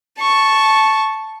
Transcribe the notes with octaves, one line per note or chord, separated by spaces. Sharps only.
A5 C#6